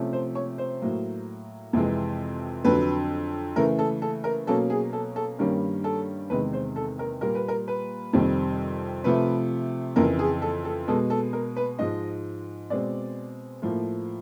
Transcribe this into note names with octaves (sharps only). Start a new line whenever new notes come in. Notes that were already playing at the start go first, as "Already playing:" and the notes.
Already playing: C3 F3 A3 C#4
C5
C#5
C5
A2 F#3 A#3
F2 C3 E3 G#3
F2 D3 F#3 B4
C#3 E3 A3 A#4
A4
A4
A#4
B2 F#3 A#3 C#4 A4
G#4
A4
A4
G2 D#3 G3 A#3 C#4 A#4
A4
E2 C3 D#3 G#3 B4
C5
A4
A#4
A#2 G3 A#3 A#4
B4
A#4
B4
F2 C3 D#3 G3 C4
C3 F3 A3 B4
F2 C#3 E3 A#4
G#4
A4
A4
B2 G#3 B3 A4
A4
A#4
B4
G#2 F3 G#3 D#5
B2 G#3 C4 D5
A2 F3 A#3